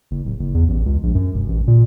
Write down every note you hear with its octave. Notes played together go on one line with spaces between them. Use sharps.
F#1
D1
F#1
E2
A1
C#2
A#1
F#2
E1
A1
A#2